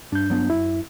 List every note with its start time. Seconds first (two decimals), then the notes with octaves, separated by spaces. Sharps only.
0.12 G2 D4 G6
0.30 F#3 B3 D4
0.50 F#2 E4